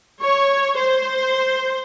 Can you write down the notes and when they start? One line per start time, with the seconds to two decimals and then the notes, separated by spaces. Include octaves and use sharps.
0.22 C#5
0.78 C5